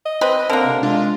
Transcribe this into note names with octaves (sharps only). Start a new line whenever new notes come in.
D#5
C4 B4 D#5
D3 A#3 C4 A#4
C3
G#3 D4 F4